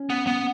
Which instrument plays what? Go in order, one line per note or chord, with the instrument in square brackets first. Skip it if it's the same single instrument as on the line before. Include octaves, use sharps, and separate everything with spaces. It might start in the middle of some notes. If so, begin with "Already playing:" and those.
Already playing: [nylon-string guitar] C#4
[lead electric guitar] B3
B3